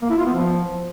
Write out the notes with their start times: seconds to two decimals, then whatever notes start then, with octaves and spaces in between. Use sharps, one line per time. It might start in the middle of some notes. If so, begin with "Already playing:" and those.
0.02 A#3
0.10 E4
0.18 F4
0.26 B3
0.34 F3